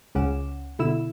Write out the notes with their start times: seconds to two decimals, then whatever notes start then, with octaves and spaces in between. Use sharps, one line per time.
0.15 C#2 C#3 C#4 F#5 D6 E7
0.79 B2 D3 E4 E5 E6 E7